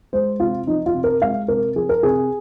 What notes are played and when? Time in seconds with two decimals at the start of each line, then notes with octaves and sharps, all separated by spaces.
0.13 G#3 C5
0.40 C3 F4
0.67 F3 D#4
0.86 F4
0.95 C3
1.04 A#4
1.22 G#3 F5
1.48 C3 A#4
1.75 F3 G#4
1.89 A#4
2.03 C3 G#4